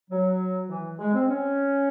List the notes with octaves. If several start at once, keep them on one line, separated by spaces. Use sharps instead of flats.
F#3
E3
G#3
C4
C#4